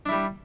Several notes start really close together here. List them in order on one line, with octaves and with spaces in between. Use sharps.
D4 E4 G3